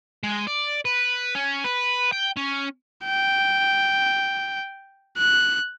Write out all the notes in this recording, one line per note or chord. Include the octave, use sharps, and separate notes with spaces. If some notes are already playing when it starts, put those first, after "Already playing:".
G#3
D5
B4
C#4
B4
G5
C#4
G5
F#6